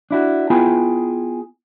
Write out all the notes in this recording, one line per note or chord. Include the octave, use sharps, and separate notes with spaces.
D4 E4 F#4
B3 E4 F4 G#4 G5 B5